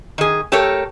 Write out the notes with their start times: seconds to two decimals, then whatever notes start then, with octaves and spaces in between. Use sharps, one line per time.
0.18 D#3 G#4
0.52 A3 G4 A4 A#4 C#5